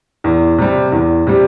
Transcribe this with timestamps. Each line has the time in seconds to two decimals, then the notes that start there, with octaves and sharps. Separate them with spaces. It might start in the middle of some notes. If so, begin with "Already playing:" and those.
0.24 E2
0.58 C3 G3
0.92 E2
1.27 C3 G3